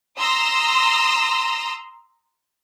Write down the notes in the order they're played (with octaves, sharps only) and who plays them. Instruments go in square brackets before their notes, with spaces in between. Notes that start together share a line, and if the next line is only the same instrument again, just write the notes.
[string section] A#5 C6 D#6 E6 A#6